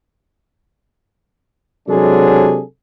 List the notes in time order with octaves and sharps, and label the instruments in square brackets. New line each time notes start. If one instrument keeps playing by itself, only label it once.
[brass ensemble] C3 F#3 G#3 D4 G#4 A4